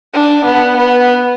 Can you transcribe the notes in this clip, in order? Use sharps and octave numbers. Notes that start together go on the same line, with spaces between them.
D4
B3
B3